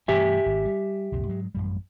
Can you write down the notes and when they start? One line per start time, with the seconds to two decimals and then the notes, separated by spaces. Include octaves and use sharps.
0.08 G2 E3 A3 G4 E5 G#5
0.46 G#1
0.65 G3
1.12 C2 F2 A#2
1.28 G#2 F#3 G#3
1.55 A1 F#2 G3